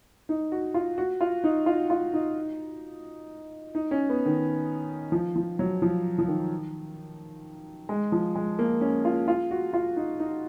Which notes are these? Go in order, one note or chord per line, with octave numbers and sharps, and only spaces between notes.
D#4
F#4
F4
F#4
F4
D#4
F4
F4
D#4
D#4
C#4
B3
D#3
F3
F3
F#3
F3
F3
D#3
G#3
F3
G#3
A#3
C#4
F4
F4
F#4
F4
D#4
D#4